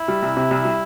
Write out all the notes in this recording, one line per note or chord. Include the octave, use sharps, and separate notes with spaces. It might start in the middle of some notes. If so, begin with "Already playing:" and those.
Already playing: E4
G3
C2
C3
C2
G3